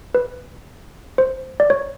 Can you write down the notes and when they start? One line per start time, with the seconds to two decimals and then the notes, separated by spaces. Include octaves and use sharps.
0.15 B4
1.18 C5
1.60 D5
1.70 C#5